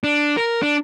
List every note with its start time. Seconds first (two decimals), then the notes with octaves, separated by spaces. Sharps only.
0.04 D4
0.37 A#4
0.62 D4